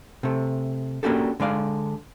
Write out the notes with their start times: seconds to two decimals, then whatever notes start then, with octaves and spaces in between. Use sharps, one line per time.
0.23 C3 A3
1.03 A#3 C#4 D4 F#4 G4 A4
1.40 D3 G#3 D5 F5